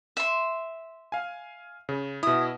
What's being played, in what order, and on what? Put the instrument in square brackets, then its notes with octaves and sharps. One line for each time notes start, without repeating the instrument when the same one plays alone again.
[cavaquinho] E5 C6
[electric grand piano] F5 G#5
C#3
[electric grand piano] B2 E4 [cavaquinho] D#6